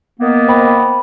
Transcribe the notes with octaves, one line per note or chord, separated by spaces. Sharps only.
D#3 A#3 B3
C5 G5 B5